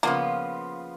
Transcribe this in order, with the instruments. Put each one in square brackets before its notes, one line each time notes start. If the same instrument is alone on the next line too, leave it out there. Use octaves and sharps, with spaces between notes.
[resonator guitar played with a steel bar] C#3 F3 B3 F4 [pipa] A#3